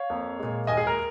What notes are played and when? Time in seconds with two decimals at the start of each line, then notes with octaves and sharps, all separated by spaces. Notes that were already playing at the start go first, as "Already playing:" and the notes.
Already playing: C#5 F5
0.10 F2 F3 A#3
0.39 A#2 G#3
0.67 D#2 D#3 G#3 D#5 G#5
0.77 G#4
0.87 A#4